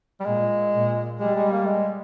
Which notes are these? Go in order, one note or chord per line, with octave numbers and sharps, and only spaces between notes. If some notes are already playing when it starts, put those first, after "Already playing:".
G3
A#2 G#3
A#2
G3 G#3
G#3
A#3
G#3